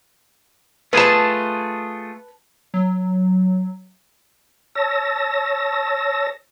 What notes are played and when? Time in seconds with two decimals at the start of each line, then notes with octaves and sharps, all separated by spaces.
0.93 A3 F4 G#4 B4 A5
2.74 F#3
4.75 C#5 A5 E6 A#6